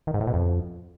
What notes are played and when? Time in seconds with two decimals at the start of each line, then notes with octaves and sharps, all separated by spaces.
0.07 D#3
0.14 G#2
0.21 A2
0.27 B2
0.34 F2